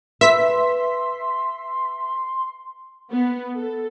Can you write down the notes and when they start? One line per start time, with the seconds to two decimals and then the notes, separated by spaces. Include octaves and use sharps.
0.21 B4 E5 C6 B6
3.12 B3
3.56 A4